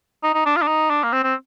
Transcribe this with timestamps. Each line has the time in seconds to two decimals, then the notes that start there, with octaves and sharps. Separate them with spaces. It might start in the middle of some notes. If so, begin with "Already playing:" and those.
0.23 D#4
0.34 D#4
0.46 D4
0.57 F4
0.62 D4
0.68 D#4
0.90 D4
1.03 A#3
1.12 C4
1.24 C4